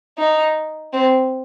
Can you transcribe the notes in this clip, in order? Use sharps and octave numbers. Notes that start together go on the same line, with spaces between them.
D#4
C4